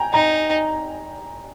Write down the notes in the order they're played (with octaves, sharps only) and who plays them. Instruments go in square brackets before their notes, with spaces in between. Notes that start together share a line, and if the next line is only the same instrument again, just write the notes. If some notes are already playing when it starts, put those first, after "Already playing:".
Already playing: [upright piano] G5 G#5 A#5
[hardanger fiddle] D#4 [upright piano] A#5